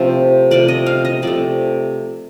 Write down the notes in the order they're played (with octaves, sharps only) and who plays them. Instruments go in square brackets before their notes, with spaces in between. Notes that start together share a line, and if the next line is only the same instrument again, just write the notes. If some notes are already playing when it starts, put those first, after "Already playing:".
Already playing: [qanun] C3 F3 A3 A4 C5
C3 F3 A3 D5
D#5
F5
D#5
C3 F3 A3 D5